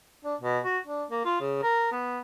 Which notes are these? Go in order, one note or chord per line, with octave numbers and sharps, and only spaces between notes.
D4
B2
F#4
D4
A#3
F4
C#3
A#4
B3